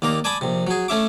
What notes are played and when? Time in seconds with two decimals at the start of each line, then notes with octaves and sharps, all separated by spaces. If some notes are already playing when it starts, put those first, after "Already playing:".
0.02 D#2 A#3 D5 A#5
0.24 D5 G#5 A5 B5 D6 D#6
0.41 A#1 C3
0.67 F#3 G#4
0.88 A3 C#4 E5 D6